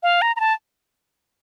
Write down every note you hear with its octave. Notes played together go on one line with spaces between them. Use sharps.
F5
A#5
A#5
A5